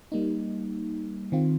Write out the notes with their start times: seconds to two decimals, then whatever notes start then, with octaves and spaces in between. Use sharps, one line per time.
0.12 G3 A#3 D#4
1.32 D#3 C4 F4